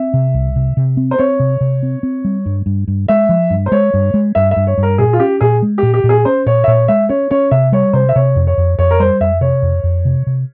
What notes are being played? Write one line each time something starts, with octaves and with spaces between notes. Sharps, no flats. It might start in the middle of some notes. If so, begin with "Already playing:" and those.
Already playing: C4 E5
C3
C2
C3
C3
C4
C5
C4 C#5
C3
C3
C4
C4
G3
G2
G2
G2
G#3 E5
F3
G2
C5
G#3 C#5
G2
G#3
G2 E5
E5
G2
C#5
G2
A#4
A#2 G#4
F4
C#4 G4
A#2 G#4
G#3
A#2 G4
G4
A#2
G#4
C#4 C5
A#2 C#5
E5
A#2 C#5
G#3 E5
C#4 C#5
C#4 C#5
C3 E5
G3 C#5
C3 C5
E5
C3 C#5
F2
C#5
F2
F2 C#5
A#4
G3 C5
F2 E5
C3 C#5
F2
F2
C3
C3